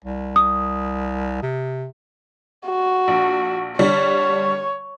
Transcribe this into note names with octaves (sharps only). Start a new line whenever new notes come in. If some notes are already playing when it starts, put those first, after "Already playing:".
C2
D#6
C3
F#4
A#1
D3 G3 C#5